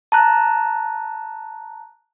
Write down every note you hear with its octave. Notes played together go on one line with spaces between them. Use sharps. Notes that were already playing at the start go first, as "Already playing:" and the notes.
A5 A#5 F#6